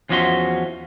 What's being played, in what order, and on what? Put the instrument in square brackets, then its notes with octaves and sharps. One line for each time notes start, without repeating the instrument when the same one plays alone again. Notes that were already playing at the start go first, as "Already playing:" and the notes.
[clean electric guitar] E2 F3 C#4 F#4 E5 C6